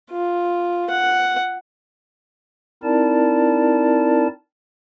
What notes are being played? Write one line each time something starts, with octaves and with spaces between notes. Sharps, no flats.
F4
F#5
C4 D#4 E4 A#4 D5 A5